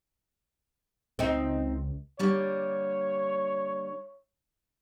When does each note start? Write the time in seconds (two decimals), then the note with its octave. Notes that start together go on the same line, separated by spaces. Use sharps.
1.19 C#2 C4 D#4
2.19 D3 G3 A#3 C#5